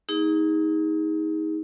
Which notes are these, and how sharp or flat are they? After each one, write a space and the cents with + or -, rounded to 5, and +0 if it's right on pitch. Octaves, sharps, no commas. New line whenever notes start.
A#3 +10 D#4 +25 G#4 -20